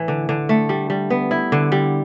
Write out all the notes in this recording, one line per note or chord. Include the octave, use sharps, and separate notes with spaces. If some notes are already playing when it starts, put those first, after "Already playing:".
Already playing: A2 E3
D3
D3
A3
G3
G3
B3
E4
D3
G3